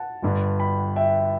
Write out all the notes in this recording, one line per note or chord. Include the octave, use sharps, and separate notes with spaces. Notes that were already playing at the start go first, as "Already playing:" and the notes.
Already playing: F#5 A5
G1 G2 D3
G5 B5
E5 G5